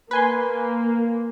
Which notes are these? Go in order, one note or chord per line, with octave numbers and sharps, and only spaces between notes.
A#3 B4 G#5 C6